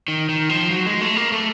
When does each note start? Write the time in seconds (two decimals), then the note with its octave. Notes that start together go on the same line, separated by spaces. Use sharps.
0.08 D#3
0.29 D#3
0.49 F3
0.70 F#3
0.86 G#3
1.01 A3
1.16 A#3
1.32 A3